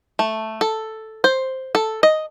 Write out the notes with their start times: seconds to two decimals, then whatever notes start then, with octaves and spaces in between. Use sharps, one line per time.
0.19 A3
0.61 A4
1.24 C5
1.75 A4
2.03 D#5